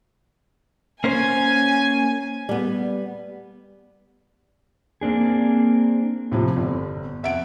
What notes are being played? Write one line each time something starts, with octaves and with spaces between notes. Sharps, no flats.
A#3 C#4 C5 G#5
G3 B3
A#3 C4 D4 G#4
A2 C3 F3
G1
F2 E5 F#5 D7